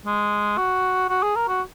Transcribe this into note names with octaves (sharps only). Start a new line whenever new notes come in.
G#3
F#4
F#4
G#4
A#4
F#4